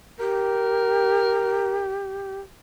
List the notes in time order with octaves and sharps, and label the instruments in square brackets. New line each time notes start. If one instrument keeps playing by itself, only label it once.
[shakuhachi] G4 [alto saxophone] A#4